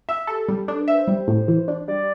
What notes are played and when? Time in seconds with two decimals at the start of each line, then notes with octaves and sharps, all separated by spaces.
0.09 E5
0.27 G4 A4
0.48 G3
0.68 D4 A4
0.81 B4
0.88 E5
0.95 C5
1.08 G3
1.28 A2
1.48 E3
1.68 D4
1.87 G3 D5